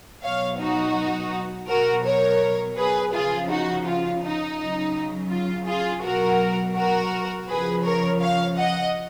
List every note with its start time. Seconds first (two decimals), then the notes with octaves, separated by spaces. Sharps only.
0.23 B2 F#3 C#5 F5
0.59 D#4 F#4
1.68 B2 F#3 F#4 A#4
2.04 A#4 C#5
2.77 G#4 B4
3.13 C#3 F3 F4 G#4
3.50 D#4 F#4
3.86 F4
4.22 D#4
4.58 C#3 F#3
5.31 F4
5.67 F4 G#4
6.03 B2 F#3 F#4 A#4
6.76 F#4 A#4
7.48 C#3 F3 G#4 B4
7.85 A#4 C#5
8.21 C#5 F5
8.57 D#5 F#5